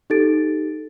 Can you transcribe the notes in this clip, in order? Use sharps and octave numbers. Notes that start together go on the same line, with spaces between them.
D#4 G4 A4 A6 D7